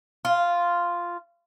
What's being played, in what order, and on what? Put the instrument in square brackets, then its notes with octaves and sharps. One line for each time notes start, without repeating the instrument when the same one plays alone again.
[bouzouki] F4